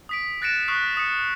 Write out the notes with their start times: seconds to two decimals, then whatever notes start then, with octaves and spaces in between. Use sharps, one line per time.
0.09 D#6 B6 D7
0.42 F#6 A6 A#6 C#7 D7 E7
0.68 C#6 D#6 F6 F#6 C7
0.97 D#6 C#7